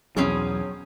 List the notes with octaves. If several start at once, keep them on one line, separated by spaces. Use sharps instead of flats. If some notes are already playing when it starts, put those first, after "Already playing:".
B1 E2 F#3 C4 C#4 G#4